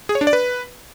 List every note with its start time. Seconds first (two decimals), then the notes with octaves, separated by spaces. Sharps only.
0.09 G#4
0.15 C#5
0.21 D4
0.27 D5
0.33 B4